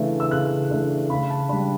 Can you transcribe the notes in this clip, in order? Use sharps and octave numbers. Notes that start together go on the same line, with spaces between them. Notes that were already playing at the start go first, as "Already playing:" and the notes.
Already playing: C#3 E3 A3 D4
E6
C#3 F#6
E3 A3 D4
C#3 B5
A5
G3 D4 B5